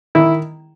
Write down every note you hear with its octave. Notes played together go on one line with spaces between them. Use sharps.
D#3 E4